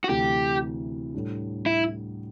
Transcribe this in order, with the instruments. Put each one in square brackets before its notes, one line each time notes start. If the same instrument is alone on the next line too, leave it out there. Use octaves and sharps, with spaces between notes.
[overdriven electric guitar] F#4
[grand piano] D2 C3 E3 [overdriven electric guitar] G4
[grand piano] A2 G3 D4
[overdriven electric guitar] E4